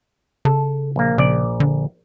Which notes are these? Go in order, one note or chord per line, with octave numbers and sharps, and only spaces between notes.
C#3 A4
A#1 A#3
A#1 C#3 D5
D3